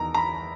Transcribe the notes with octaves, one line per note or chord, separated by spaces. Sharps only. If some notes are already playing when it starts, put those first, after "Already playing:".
Already playing: E2 D#3 A#5
A#5
B5